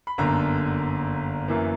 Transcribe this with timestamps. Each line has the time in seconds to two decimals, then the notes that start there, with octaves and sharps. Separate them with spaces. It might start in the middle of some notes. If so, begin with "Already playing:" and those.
0.07 B5
0.18 G1 F#2 D3 A#3 A#5
1.48 F#2 E3 A#3